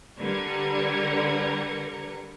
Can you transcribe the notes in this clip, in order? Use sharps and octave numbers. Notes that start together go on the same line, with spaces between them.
D3 G3 A#4 B4 G#6 C#7